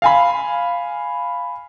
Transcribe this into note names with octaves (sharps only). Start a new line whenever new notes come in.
F5 G#5 B5